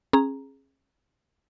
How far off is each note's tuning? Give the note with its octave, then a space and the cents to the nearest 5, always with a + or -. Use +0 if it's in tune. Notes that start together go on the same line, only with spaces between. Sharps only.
C#4 -40 G#4 +0 A#5 +0